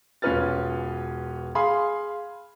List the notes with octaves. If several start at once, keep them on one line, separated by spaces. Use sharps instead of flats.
E1 C#4 F4 B4 F6 A6
G#4 F5 B5 C6